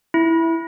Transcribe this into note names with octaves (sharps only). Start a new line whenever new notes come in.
E4